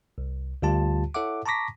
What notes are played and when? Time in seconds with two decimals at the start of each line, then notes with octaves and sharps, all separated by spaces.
0.18 C2
0.62 D2 D3 G3 F4 G4 A5
1.14 E4 A4 C#5 E5 F#5 D6
1.45 A5 A#5 C#6 D6 A#6 B6